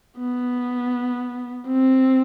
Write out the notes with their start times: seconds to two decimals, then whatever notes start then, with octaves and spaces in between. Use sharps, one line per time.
0.19 B3
1.67 C4